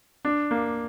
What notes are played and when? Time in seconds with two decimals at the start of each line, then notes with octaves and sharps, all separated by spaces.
0.25 D4
0.51 A#3